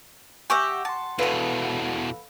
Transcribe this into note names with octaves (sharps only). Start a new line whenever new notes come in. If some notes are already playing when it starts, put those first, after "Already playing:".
G4 E5 F#5 G#5 C#6 D6 A#6
F#5 A5 C6
E2 B2 A4 B4 F5 F#5